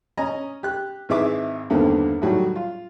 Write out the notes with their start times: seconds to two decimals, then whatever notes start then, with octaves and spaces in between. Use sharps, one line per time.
0.17 C#4 D#5 G#5 A#5
0.63 G4 F#6
1.09 G#1 E3 G#4 E5 D6
1.70 E2 G2 D3 D#3 A#3 C4
2.22 A2 D#3 F#3 G3
2.56 F4